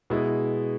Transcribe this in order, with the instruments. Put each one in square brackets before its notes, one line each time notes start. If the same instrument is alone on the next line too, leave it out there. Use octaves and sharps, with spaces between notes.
[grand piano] B2 G#3 E4